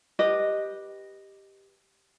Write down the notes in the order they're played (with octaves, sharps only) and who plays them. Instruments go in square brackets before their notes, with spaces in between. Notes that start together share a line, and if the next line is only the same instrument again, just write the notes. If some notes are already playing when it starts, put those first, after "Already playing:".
[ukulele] G4 B4 D#5